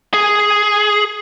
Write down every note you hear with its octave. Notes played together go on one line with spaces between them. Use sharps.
G#4